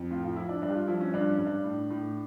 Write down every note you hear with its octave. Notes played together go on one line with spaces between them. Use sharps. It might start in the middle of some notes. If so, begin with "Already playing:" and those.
Already playing: F2
A2 F4
F4
F3 E4
D4
G2 D4
G4
F4
F3 E4
C#4
G2 D4
C#4
G2
D4
A2
A2